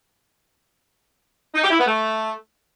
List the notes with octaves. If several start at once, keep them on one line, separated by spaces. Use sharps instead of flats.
D#4
G4
E4
B3
A3